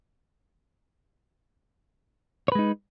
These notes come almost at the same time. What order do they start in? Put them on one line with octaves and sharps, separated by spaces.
C#5 B4 G#3 D#4